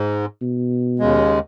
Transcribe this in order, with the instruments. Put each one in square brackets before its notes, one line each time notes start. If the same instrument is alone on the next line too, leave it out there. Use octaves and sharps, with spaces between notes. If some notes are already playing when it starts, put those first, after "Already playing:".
Already playing: [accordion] G#2
[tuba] B2
[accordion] D#2 C#3 G#3